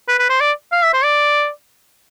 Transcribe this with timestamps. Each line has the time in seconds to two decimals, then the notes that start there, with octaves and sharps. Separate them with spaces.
0.08 B4
0.19 B4
0.30 C5
0.41 D5
0.72 F5
0.83 E5
0.93 C5
1.04 D5